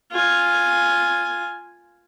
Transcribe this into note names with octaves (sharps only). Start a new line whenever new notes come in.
F4 G#5